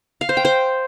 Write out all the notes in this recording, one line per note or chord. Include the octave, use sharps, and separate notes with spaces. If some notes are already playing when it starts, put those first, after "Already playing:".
F5
C5
G5
C5